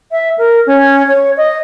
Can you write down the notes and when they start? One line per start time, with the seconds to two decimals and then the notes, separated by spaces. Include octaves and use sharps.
0.12 E5
0.38 A#4
0.67 C#4
1.07 C#5
1.37 D#5